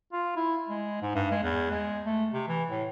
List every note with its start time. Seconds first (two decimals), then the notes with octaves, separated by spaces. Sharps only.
0.13 F4
0.36 E4
0.68 G#3
1.02 G#2
1.15 G2
1.31 G#3
1.43 E2
1.71 G#3
2.06 A3
2.33 C3
2.48 E3
2.70 A2